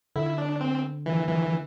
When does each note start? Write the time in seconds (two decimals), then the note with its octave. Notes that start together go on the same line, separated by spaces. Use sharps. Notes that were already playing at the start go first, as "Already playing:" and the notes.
0.16 D3 E4
0.38 D4
0.61 C4
1.06 E3
1.28 E3